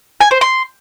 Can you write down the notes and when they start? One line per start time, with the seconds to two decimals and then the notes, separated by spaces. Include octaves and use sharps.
0.21 G#5
0.31 C5
0.41 C6